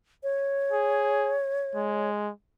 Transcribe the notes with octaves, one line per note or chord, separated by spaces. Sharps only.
C#5
G#4
G#3